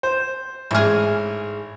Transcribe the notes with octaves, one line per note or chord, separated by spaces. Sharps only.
C5
A1 G#2 G#4 F6